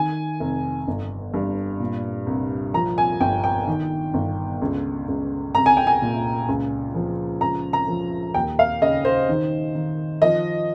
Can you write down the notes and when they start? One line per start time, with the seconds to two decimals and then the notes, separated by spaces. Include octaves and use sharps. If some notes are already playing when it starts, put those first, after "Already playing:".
Already playing: D#3 G#5
0.40 F1
0.88 G1
1.34 G2
1.80 A#2
2.27 C2
2.74 F3 A#5
2.98 G#5
3.20 G1 G5
3.44 G5
3.67 D#3
4.14 G1
4.62 C#2
5.08 C#2
5.55 C2 A#5
5.66 G#5
5.77 G5
5.87 G#5
6.02 A#2
6.49 C#2
6.95 F3
7.41 C#2 A#5
7.73 A#5
7.88 F3
8.34 D#2 G5
8.59 F5
8.82 C#3 D#5
9.05 C5
9.29 D#3
9.75 D#3
10.22 F3 D#5